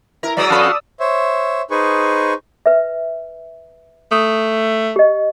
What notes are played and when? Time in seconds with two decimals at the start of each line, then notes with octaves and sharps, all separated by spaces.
0.23 E4 A#4 A#5
0.37 F#3 G#3 B3 D5 D#6 E6
0.50 F2 F#4 A4 F5 A5 B5 C#6
1.00 C5 C#5 E5
1.71 D#4 G#4 B4 C5 G#5 C#6
2.66 B4 E5
4.11 A3 D#6
4.96 G4 D#5